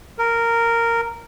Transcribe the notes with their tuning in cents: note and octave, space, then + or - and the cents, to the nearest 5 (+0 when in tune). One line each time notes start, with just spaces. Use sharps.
A#4 -10